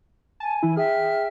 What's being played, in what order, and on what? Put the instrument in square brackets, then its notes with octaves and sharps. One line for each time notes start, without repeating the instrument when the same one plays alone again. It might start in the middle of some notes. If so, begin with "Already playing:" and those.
[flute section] G#5 [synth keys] A5
[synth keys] E3 E4
[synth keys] G#4 [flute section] E5 G5 F6